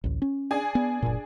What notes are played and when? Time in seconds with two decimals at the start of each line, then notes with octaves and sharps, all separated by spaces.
0.04 A1 D2
0.22 C#4
0.51 D4 G#4 G#5
0.75 B3
1.02 F#1 A#2